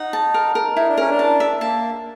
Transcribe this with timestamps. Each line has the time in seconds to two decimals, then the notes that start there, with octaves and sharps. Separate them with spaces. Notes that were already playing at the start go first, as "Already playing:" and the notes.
Already playing: D#4 F#5
0.13 A5
0.34 A#4
0.55 A#4
0.76 D#4 E4
0.87 D4
0.97 C#4 A#4
1.10 D4
1.19 A5
1.40 E5
1.61 A#3 A5